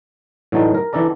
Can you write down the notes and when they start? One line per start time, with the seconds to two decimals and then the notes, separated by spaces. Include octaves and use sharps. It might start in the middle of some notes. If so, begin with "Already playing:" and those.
0.52 A2 D3 E3 F#3 D#4 A5
0.75 A#4
0.93 E3 D4 A4 D5 A#5